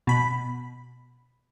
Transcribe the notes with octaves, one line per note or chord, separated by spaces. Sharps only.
B2 B5